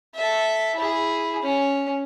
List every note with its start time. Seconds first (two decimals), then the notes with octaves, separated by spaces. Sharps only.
0.15 A4 E5
0.76 E4 G#4
1.42 C#4